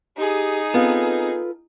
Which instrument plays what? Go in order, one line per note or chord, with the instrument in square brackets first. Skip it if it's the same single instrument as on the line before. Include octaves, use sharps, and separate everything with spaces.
[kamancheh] D#4 G#4 [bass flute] G4
[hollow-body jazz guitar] B3 [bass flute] C4 [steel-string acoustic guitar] F4 A4 B4